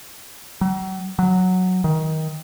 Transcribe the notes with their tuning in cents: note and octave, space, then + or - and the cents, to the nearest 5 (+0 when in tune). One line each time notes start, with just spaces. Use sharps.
F#3 +40
F#3 -5
D#3 +20